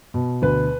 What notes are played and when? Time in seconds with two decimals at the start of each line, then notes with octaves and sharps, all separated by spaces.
0.14 B2
0.42 D2 B4